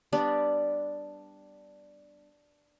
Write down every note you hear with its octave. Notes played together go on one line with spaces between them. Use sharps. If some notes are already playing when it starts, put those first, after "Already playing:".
G3 B3 D4 G4